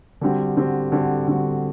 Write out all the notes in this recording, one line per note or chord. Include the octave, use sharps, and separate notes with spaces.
D3 G3 C4 F#4
D3 G3 C4 F#4
D3 G3 C4 F#4
D3 G3 C4 F#4